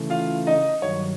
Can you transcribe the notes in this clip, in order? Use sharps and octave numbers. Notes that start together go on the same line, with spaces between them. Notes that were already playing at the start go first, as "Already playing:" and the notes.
Already playing: C#3 E3 A3
F4 F5
D#4 D#5
G2 D#3 F#3 C#5